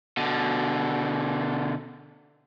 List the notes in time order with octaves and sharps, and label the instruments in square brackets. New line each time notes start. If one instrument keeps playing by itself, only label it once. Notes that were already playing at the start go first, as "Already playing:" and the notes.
[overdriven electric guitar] B2 D3